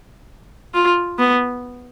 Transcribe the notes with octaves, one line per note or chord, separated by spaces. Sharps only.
F4
B3